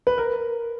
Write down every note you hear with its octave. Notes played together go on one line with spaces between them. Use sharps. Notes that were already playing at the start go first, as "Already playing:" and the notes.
B4
A#4